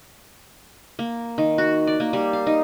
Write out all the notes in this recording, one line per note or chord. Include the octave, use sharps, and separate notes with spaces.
A#3
D#3
F#4
D5
A#3
G3
F5
D#4